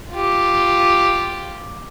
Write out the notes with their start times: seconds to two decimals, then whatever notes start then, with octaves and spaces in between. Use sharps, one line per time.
0.11 F4 G4